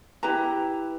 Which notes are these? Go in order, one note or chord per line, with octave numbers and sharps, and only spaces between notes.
E4 G4 B4 A#5